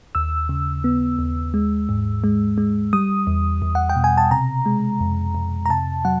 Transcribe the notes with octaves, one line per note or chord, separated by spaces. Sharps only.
D#2 E6
C#3
B3
D#2
G#3
G#2
G#3
G#3
G3 D#6
E2
E2
F#5
G5
B2
G#5
A5
C3 A#5
G#3
F2
F2
A#5
C3 A5
F#3 F#5